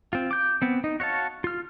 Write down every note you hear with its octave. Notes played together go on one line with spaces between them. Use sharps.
C4 F4
D6 G6
B3 C4
D#4
F#4 C#5 F5 A5
F4 F6